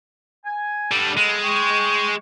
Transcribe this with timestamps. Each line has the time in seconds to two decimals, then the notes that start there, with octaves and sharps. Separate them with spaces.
0.45 G#5
0.92 C#3 G3 B3 D4 A4
1.17 G#3
1.43 G5 C#6